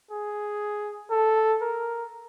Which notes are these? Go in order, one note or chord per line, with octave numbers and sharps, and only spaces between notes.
G#4
A4
A#4